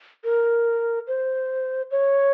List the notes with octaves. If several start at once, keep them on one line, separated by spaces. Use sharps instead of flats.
A#4
C5
C#5